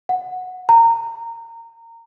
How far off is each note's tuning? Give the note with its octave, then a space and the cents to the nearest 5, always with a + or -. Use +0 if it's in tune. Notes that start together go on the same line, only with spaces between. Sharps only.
F#5 -10
A#5 -20